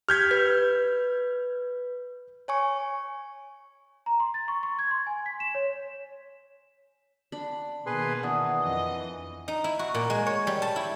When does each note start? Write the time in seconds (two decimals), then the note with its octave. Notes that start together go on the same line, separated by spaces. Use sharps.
0.09 G4 F6 G6 G#6 B6
0.31 B4
2.48 C#5 G#5 C#6
4.06 A#5
4.20 C6
4.34 A6
4.48 C#6
4.63 C#6
4.79 G#6
4.91 C6
5.07 G#5
5.26 B6
5.40 E7
5.55 C#5
7.32 D4 B5
7.86 B2 D#3 A#3 G#4 B4 C6
8.23 E3 D4 F#5 D#6
8.62 F2 D#5
9.48 D#4
9.64 E4
9.79 F#4
9.94 A#2
10.10 G#3
10.27 C#5
10.47 G3
10.62 A5
10.76 E4